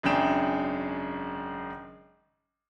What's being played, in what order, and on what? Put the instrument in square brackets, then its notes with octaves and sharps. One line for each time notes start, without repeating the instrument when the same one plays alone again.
[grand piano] G#1 F#2 C#3 D4 G5 E7